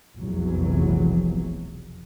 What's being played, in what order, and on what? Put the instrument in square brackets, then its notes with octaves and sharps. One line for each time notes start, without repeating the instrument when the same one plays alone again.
[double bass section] F1 B1 E2 F#3